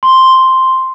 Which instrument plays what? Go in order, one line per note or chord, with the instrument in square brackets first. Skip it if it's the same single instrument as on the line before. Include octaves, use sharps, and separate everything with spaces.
[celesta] C6